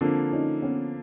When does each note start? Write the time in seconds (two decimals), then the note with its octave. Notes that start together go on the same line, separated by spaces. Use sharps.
0.01 D3 F3 A#3 C4 D4
0.32 C#4 D#4
0.62 B3 C#4